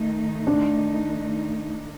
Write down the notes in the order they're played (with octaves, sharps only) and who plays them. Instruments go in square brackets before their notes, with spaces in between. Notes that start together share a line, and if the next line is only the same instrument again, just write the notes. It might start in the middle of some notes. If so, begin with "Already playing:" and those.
Already playing: [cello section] D#3 A3 D#4
[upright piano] D4